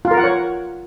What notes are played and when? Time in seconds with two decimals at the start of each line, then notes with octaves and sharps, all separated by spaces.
0.05 F4
0.11 A#4
0.17 F#5
0.23 C#5